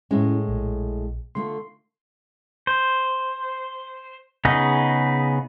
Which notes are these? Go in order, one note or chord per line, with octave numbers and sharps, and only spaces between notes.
A2 G#3 C#4 E4
A#1
D3 A3 F4 C6
C5
C#3 B3 D#4 G#4 D#5